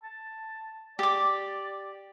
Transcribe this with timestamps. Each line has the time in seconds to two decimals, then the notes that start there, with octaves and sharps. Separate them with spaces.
0.04 A5
0.99 G4 D5 D6